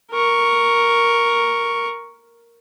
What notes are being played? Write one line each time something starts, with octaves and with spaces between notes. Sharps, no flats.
A#4 C#6